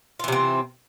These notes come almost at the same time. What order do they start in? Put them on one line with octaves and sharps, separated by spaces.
F4 E3 C3 C4